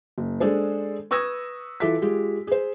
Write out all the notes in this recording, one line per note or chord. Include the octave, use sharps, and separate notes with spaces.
F#1
G#3 D4 G#4 A4 C5
B4 C#6 D#6 E6 G#6 A#6
E3 F4 A4 E5 D6 B6
G#3 F4 G4
G#4 C5